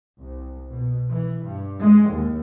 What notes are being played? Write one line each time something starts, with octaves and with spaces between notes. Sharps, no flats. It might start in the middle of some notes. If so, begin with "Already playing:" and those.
C2
B2
E3
G2
G#3
D#2